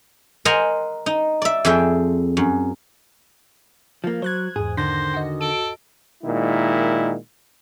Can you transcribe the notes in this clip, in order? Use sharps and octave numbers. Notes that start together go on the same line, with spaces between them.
A#4 C5 D#5 F#5 G#5 A#5
D#4
D5 E5
F2 G#4 E5 G5
F#2
F3 A#3
F#3 C5 F#6 G#6
E2 G#2 G#4
D3 D#3 C5 A#6
F#4 D#5
A4 D7
A#2 D#3 G#3 E4